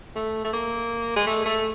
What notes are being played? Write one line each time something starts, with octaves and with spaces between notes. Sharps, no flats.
A3
A3
A#3
G#3
A3
A3